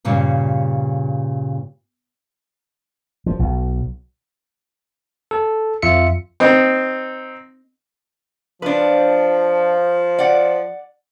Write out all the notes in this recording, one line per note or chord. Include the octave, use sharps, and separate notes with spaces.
G2 A#2 C#3 G3
F3
B1
A4
F2 F4 E5 C#7
C4 D#4
F3 D4 B4
D5 F#5